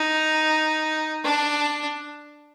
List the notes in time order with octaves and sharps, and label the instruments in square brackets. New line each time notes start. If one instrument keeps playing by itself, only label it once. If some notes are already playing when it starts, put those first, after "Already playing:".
Already playing: [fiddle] D#4
D4